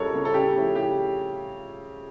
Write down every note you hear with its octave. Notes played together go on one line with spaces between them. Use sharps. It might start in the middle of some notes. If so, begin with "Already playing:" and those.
Already playing: C#2 C#3 G3 A4 A#4 C#5
C#3 G3
A4
C#3 G4
F3 A3 C#4 E4
C#3 G4